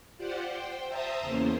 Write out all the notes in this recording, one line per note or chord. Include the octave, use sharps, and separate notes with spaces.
F4 G4 C5 D5 F#5
C5 G5
C5 E5 A5 A#5 D#6
E2 C#3 A#3 C5